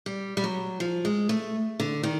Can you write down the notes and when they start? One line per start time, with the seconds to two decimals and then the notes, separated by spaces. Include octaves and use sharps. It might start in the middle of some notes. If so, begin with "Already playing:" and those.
0.06 G3
0.37 G3
0.44 F#3
0.80 F3
1.05 G#3
1.29 A3
1.80 D3
2.03 D#3